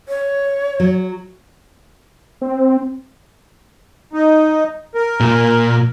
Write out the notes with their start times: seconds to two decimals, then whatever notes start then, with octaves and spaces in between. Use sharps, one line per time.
0.08 C#5
0.80 F#3
2.41 C4
4.13 D#4
4.95 A#4
5.20 A#2